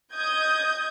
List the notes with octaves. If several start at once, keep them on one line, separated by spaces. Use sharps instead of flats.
D#5 D#6 G6 G#6